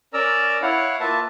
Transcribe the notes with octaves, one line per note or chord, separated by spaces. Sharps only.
C#4 A#4 D5 A#5 E6
E4 C#5 F5 F#5
A#3 F4 B4 E5 A5